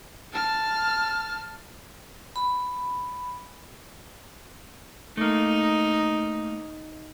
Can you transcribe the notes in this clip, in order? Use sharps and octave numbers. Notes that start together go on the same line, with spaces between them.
A5 F6
B5
A3 A#3 D#4